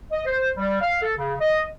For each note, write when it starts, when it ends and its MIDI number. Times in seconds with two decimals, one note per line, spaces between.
0.12 0.24 75
0.26 0.49 72
0.56 0.77 55
0.81 0.99 77
1.02 1.12 69
1.17 1.33 49
1.40 1.63 75